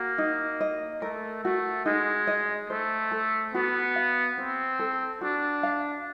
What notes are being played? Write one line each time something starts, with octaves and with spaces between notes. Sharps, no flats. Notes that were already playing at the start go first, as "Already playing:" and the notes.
Already playing: A#3 F#4
D#4
D#5
A3 A#4
A3 F#4
G#3 D#4
D#5
A3 C5
A4
B3 F#4
F5
C4 C5
A4
D4 F#4
F5